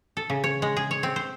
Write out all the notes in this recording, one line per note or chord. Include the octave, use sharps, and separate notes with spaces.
A4
C#3
C#5
G#3
G#4
C#5
C4
C5